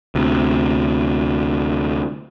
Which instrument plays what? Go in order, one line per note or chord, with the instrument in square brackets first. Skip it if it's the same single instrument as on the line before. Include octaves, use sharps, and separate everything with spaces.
[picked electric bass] D2 C3